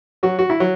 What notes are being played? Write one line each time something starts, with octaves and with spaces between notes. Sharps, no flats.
F#3 F#4
F#4
E4
F#3